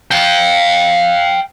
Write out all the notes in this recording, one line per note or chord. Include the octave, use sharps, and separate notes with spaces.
F5 G5